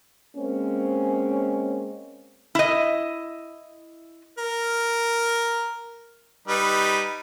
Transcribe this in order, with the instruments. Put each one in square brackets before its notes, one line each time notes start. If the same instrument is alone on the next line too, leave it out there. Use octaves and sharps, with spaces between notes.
[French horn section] G#3 A#3 C4 C#4
[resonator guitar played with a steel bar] E4 D#5
[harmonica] A#4
G3 D#4 B4